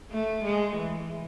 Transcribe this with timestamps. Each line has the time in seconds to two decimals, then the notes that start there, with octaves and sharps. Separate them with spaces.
0.11 A3
0.44 G#3
0.76 E3